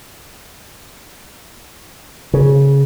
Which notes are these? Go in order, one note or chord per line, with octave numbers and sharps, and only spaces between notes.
C#3